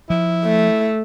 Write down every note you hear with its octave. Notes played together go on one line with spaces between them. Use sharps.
F3 E4
A3